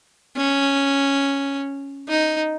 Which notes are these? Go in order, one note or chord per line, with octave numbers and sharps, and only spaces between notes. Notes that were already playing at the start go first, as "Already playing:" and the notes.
C#4
D#4